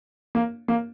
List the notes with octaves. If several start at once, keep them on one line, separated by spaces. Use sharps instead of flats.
A#3
A#3